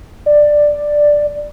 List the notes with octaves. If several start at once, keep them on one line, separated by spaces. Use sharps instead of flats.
D5